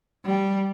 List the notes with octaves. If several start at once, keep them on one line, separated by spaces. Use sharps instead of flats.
G3